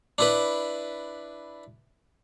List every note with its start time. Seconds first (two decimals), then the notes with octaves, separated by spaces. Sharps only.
0.18 D4 E4 B4